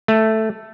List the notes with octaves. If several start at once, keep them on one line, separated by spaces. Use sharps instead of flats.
A3